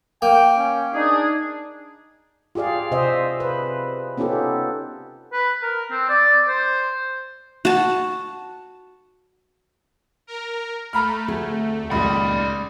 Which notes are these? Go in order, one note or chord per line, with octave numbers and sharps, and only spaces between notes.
A#3 G5
C#4
D4 D#4 G#4
F4 G4 G#4 D5 F5
C3 C5 D#5 E5
B4
B3 C#4 D#4 F4 G4 A4
B4
A#4
C4
D5
C5
F#4 A5
A#4
A3 A#5 B5 F6
D2 C4 G#4
C#2 A#2 D#3 G4 D5 B5